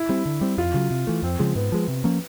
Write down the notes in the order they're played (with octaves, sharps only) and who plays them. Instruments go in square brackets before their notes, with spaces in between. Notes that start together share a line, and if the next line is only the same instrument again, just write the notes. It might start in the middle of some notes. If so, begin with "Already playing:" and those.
Already playing: [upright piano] E4
[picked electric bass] G3 C4
D3
G3 C4
[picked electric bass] F2 [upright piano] F4
[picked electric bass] C#3 F#3
C3
E3 A3
[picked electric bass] F2 [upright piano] C4
[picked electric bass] C#3 F3 G#3
[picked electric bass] G#2 [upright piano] B3
[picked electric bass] F3 G#3
C3
F3 A#3 C#4